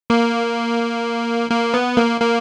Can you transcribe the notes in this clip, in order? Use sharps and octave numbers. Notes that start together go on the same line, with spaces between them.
A#3
A#3
B3
A#3
A#3